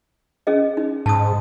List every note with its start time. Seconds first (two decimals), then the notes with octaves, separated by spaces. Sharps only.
0.47 C#4 G#4 D#5
0.77 D#4
1.06 G#2 A5 D#6